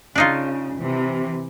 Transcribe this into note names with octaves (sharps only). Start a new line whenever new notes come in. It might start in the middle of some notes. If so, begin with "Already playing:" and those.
C#3 D4 D#4 F4
C3 E3